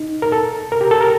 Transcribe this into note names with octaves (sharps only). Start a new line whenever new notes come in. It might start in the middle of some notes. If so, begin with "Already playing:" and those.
Already playing: D#4
A#4
A4
A#4
G4
A4
A#4